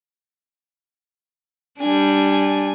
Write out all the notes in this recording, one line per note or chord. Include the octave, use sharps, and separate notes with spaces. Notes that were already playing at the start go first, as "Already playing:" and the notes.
G3 D4 G#5